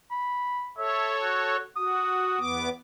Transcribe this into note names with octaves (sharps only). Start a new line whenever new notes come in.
B5
A4 C#5 E5
F#4
F#4 D#6
E2 B3 D6